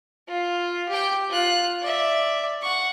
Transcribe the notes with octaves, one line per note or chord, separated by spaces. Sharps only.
F4
G4 G5
F4 F#6
D5 E5
F#5 C#6